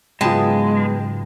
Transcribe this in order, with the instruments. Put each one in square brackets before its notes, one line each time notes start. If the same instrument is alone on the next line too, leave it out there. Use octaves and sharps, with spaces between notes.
[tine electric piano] G#2 C#3 F#3 [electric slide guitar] G#3 [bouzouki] B3 A5 [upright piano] F4 G5